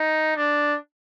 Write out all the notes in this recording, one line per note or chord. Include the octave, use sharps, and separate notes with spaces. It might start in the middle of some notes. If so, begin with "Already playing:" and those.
Already playing: D#4
D4